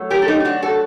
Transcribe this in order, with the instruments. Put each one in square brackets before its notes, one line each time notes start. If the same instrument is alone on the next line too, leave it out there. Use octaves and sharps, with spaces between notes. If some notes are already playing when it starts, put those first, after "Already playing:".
Already playing: [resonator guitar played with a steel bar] F#3 A3
G4 A#4
A4
D#4 G4
D#4
D4 F#4
F#4 A4